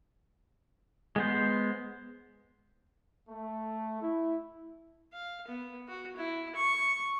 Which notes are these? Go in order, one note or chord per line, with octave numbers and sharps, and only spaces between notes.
G#3 B3 C5
A3
E4
F5
B3
F#4
E4
C#6